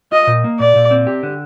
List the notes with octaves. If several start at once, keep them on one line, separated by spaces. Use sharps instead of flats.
F4 D#5
A#2
A#3
A#2 D5
A#2
C4
G4
D3